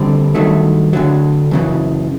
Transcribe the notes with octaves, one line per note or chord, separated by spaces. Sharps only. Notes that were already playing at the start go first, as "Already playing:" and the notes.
Already playing: D2 D3 G3 C4
G2 D#3 F#3 A3
D2 D3 F#3
F#2 C#3 E3